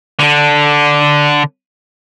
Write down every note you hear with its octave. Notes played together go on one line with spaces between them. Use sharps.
D3 D4